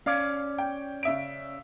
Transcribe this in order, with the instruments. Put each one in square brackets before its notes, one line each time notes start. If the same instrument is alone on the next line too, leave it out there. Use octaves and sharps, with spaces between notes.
[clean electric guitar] C#4 D5 [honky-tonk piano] F5
[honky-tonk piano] G5
C#3 E5 D7